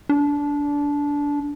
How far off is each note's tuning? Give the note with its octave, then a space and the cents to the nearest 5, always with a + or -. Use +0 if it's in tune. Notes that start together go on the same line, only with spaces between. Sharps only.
D4 -20